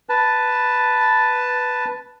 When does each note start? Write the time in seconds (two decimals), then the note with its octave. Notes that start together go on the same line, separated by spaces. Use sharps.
0.09 B4 A5